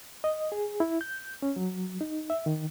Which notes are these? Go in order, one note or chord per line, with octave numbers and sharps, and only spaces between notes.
D#5
G#4
E4
G6
C#4
F#3
D#4
E5
D#3